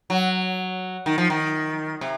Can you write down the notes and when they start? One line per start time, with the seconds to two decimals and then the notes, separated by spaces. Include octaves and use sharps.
0.10 F#3
1.06 D#3
1.18 F3
1.30 D#3
2.01 C3